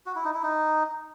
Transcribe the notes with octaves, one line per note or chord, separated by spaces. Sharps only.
F#4
E4
D#4
E4
D#4